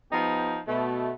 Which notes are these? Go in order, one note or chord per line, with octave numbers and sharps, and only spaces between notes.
F3 B3 D#4 G4
B2 A3